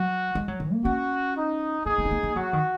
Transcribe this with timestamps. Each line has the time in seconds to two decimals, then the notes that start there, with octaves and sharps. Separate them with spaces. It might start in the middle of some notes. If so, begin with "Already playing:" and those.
Already playing: F#3 F#4
0.35 G#3
0.48 F#3
0.60 D#3
0.73 A#3
0.85 C#4 F#4
1.36 D#4
1.86 A#3 D#4 G#4
1.98 A#3
2.05 C#4
2.11 A#3
2.23 A#3
2.36 F#3 F#4
2.53 D#3